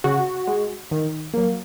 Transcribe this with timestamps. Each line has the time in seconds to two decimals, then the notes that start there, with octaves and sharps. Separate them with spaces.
0.04 C#3 F#4
0.47 G#3
0.91 D#3
1.34 F#3 A#3